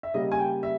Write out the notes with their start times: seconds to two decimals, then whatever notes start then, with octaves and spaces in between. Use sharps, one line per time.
0.03 E5
0.14 C#3 G3 A#3 D#5
0.32 G#5
0.39 G5
0.63 E5